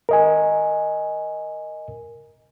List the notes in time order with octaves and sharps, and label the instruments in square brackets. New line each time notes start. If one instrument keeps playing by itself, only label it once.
[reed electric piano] A#4 D#5 G#5